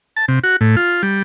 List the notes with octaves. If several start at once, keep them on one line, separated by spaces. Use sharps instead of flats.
A5
C3
F#4
A2
F4
G3